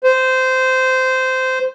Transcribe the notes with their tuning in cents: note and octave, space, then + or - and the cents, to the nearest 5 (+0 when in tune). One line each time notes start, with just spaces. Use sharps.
C5 -15